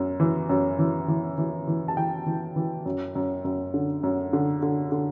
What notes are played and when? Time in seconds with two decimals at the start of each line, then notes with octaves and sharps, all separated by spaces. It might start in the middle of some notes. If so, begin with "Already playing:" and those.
Already playing: F#2
0.20 E3
0.49 F#2
0.79 E3
1.08 E3
1.38 E3
1.67 E3
1.88 A5
1.97 E3 G5
2.26 E3
2.56 E3
2.86 F#2
3.15 F#2
3.45 F#2
3.74 D3
4.03 F#2
4.33 D3
4.62 D3
4.92 D3